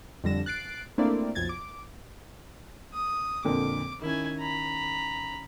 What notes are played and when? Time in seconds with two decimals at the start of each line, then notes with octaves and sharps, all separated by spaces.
0.24 F2 D3 G3 A#6 E7
0.46 F#6 A6 C7 D7
0.98 A3 A#3 C4 D4 E4 D5
1.35 B1 F2 G#6 A6
1.49 D6
2.94 D#6
3.44 F2 A#2 D3 D6
4.02 D#3 C#4 E4 G#5
4.39 A#5 B5